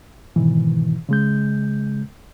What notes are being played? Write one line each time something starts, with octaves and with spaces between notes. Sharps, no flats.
G#2 B2 D#3 E3
C#3 G#3 G6